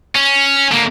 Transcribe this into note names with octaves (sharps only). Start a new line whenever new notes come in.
C#4
D3 A#3